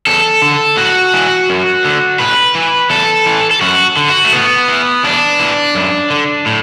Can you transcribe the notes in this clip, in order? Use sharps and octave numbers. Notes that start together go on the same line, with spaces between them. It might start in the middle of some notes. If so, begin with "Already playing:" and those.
E2 A4
D3
A2 F#4
E3
F#2
D3
A2 B4
E3
E2 A4
E3
A4
F#2 F#4
D3
F#4
A3
A2 B3
E3
E2 D4
E3
F#2
D3
A2